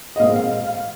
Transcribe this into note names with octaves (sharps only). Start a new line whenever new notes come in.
D#5
A#2 G#3 C4 F5
F5
F5
F5